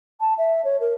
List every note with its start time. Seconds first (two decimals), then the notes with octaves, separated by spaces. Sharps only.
0.20 A5
0.38 E5
0.64 C#5
0.80 A#4